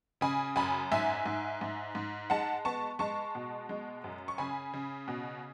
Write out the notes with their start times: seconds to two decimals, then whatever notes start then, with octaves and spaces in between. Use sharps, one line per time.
0.21 C#3 G#5 B5
0.56 F#2 G#5 B5
0.92 G#2 E5 G#5
1.26 G#2
1.61 G#2
1.95 G#2
2.30 G#3 F#5 A5
2.65 B3 A5 C#6
2.99 G#3 A5 C#6
3.35 B2
3.69 G#3
4.04 F#2
4.28 C#6
4.38 C#3 G#5 B5
4.74 C#3
5.08 B2